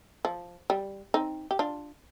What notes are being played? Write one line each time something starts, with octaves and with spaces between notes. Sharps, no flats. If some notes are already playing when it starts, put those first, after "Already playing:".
F3
G3
C4 D#4
G4
D4 F4